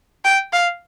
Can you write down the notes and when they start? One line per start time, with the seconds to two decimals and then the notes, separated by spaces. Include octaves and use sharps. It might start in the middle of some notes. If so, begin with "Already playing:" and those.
0.25 G5
0.53 F5